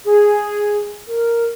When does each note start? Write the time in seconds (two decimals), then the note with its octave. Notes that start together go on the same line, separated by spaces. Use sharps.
0.05 G#4
1.07 A#4